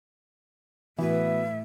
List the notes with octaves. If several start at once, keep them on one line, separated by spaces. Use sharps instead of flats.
A2 E3 B3 F#4 B4 E5